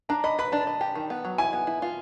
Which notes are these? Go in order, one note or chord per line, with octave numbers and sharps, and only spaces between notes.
D4 A#5
D#5 B5
B4 B5
D4 A5
D#5
G4
D#3
B3
F#3
E4 G#5
B3
E4
F4